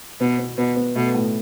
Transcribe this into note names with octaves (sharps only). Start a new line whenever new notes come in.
B2 B3
B3
B2 B3
B3
B2 A3
A2